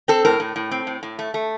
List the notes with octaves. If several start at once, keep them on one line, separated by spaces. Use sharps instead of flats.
C4 A4
A2 A#4
A2
A2
C4
A2
A2
A3
A3